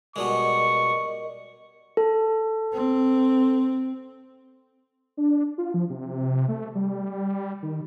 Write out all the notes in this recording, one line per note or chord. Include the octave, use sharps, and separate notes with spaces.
B2 G3 G#3 A#4 D5 D#5 C#6
A4
C4
D4
F4
F3
C3
A3
G3
D#3